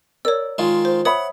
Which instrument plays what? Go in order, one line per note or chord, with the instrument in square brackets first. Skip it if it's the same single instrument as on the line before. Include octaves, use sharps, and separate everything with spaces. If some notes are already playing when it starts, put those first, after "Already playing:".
[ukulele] A#4 D5 [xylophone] C#5 E6
[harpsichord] D#3 G#3 F4
[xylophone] C5
[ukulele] C#5 E5 B5 [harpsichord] F#5 [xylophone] D#6